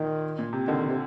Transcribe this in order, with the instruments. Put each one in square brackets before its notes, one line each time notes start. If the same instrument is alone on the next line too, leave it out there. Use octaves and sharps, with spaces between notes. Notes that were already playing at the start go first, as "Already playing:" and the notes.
Already playing: [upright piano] A#2 [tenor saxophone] D#3
[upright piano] A#2
C3
[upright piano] D3 [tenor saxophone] D#3
[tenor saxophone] D#3
C3